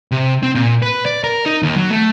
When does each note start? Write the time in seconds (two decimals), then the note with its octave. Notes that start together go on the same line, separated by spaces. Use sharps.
0.12 C3
0.43 C4
0.55 A#2
0.82 B4
1.06 D5
1.24 A#4
1.46 D#4
1.63 D#2
1.76 F#3
1.90 A3